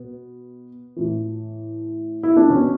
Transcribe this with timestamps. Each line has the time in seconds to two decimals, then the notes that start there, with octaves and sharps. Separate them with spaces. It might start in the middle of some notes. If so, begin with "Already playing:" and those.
Already playing: B2 B3
0.96 A2 E3
2.23 E4
2.37 D4
2.50 B2 C#4